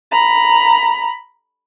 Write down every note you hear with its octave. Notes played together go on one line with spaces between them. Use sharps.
A#5 B5